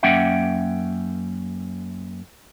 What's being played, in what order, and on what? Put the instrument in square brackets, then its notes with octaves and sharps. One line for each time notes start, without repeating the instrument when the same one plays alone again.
[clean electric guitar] F#2 A#3 C#4 E5 F#5 G5